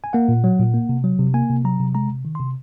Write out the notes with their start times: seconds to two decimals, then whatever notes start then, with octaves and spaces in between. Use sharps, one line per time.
0.04 G#5
0.13 A#3 F#5
0.29 A#2
0.44 F#3
0.59 A#2
0.74 A#3
0.89 C3
1.04 F#3
1.19 C3
1.34 A#3 G#5
1.50 C3
1.65 F#3 A#5
1.80 C3
1.95 G#3 A#5
2.10 C3
2.25 D#3
2.35 C3 C6